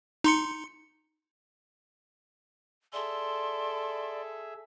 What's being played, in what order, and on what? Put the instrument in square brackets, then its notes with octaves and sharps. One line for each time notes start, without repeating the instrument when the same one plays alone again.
[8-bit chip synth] D#4 C6 C#7
[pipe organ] G#4 E5 [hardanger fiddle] A4 [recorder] D5 [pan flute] C6